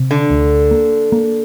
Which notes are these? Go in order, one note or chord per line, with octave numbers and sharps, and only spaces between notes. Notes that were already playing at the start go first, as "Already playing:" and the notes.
Already playing: C3
D3
D2
A#3
A#3